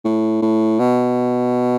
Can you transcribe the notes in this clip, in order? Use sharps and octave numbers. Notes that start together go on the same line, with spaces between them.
A2
A2
B2